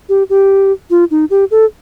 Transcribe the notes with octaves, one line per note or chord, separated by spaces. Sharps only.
G4
G4
F4
D#4
G4
A4